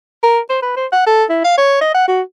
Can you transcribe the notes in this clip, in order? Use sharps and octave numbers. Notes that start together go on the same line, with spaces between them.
A#4
C5
B4
C5
F#5
A4
E4
F5
C#5
D#5
F#5
F#4